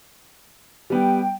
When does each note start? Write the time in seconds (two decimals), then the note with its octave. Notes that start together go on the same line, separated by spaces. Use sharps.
0.90 G3 B3 G5